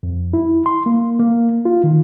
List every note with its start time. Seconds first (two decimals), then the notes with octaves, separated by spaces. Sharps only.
0.03 F2
0.33 E4
0.66 C6
0.86 A#3
1.20 A#3
1.65 F4
1.84 D#3